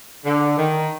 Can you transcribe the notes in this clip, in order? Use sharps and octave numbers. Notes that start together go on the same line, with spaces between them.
D3
D#3